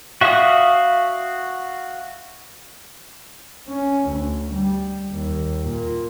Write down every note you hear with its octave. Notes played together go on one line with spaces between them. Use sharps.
F#4 E5 F5 C#6 D#6
C#4
D2
G3
D#2
A#2